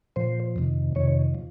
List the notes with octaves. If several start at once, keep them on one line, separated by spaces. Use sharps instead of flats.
A#2 F3 C5
F2 C3 D#3
F2 C3 D#3 C#5
F3